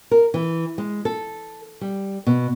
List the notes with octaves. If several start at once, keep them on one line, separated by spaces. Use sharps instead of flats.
A#4
E3
G#3
A4
G3
B2